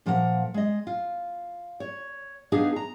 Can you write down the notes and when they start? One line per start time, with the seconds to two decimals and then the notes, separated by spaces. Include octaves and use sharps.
0.06 A#2 F3 A#3 A#4 F#5
0.54 G#3 D#5
0.87 F4
1.80 C#5
2.52 B3 D4 D#4 F4 G4 G#4
2.76 A#5